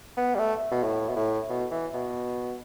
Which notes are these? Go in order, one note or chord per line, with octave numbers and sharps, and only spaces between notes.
B3
G3
A3
B2
A2
B2
A2
B2
E3
B2